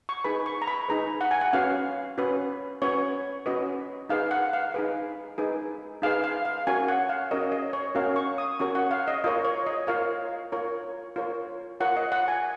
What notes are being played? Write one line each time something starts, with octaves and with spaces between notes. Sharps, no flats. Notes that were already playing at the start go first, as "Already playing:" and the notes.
C#6
D#4 G#4 B4 B5
C#6
A#5
B5
D#4 G#4 B4 A#5
F#5
G#5
F#5
C#4 F#4 B4 F5
C#4 F#4 B4
C#4 F#4 B4 C#5
C#4 F#4 B4 D#5
D#4 G#4 B4 F5
F#5
F5
D#4 G#4 B4
D#4 G#4 B4
D#4 G#4 B4 F5
F5
F5
C#4 F#4 A#4 C#5 G#5
F#5
F5
C#4 F#4 A#4 C#5 D#5
D#5
C#5
C#4 F#4 A#4 C#5 F5
C#6
D#6
C#4 F#4 A#4 C#5 C#6
F#5
F5
D#5
F4 A#4 C#5 D#5
C#5
D#5
F4 A#4 C#5 F5
F4 A#4 C#5
F4 A#4 C#5
F4 A#4 C#5 F#5
D#5
F#5
G#5